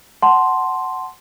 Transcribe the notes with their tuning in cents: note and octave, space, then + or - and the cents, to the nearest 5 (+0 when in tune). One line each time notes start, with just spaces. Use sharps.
F#5 +10 A5 -20 C6 +0